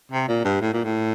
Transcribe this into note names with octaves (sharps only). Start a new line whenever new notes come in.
C3
A#2
G2
A2
A#2
A2